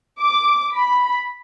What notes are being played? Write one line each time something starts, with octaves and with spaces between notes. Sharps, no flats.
D6
B5